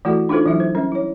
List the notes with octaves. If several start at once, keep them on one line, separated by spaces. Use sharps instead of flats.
E3 A3 E4 F#4 A4 D5
D4 D#4 F4 A4 C5
E3 F#3 E4 E5
C5
G3 C#4 A#4
E4 C#5